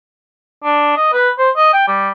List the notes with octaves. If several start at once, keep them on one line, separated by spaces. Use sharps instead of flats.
D4
D#5
B4
C5
D#5
G5
G3